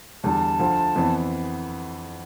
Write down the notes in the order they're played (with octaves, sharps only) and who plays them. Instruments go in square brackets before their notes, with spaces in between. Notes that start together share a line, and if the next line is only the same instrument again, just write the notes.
[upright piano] E2 D3 G3 [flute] A5
[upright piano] D2 D3 F3
F2 E3 B3